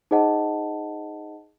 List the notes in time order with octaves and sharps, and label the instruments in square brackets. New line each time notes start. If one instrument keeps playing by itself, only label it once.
[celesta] D#4 G#4 C5 D#5 F#5 A5